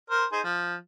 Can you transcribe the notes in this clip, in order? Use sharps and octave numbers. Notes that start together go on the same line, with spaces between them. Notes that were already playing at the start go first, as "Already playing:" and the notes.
A#4 C5
D#4 G#4 C5
F3